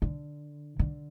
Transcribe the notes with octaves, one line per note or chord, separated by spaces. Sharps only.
D3
D3